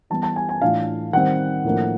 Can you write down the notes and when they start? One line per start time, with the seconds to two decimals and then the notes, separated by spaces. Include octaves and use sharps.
0.10 E3 G3 B3 A5
0.23 A5
0.36 G#5
0.49 G#5
0.62 A2 E3 A3 D4 F4 F5
1.13 D#3 G3 C4 F#5
1.64 A2 F3 A#3 D4